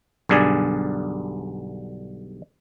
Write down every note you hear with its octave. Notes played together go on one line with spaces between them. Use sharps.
B1 G2 D3 G#4 D5 G#5